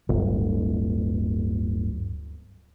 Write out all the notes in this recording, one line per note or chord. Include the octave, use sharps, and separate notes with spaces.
D1 G1